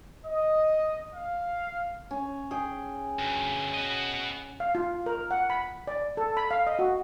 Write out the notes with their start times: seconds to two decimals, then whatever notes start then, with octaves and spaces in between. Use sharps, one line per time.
0.25 D#5
1.14 F5
2.11 C#4
2.51 G#4 G5
3.19 D2 G2
3.74 F#4 D#5
4.60 F5
4.75 F4
5.06 A#4
5.31 F#5
5.50 B5
5.87 D5
6.17 A4
6.37 B5
6.51 F5
6.67 D#5
6.79 F#4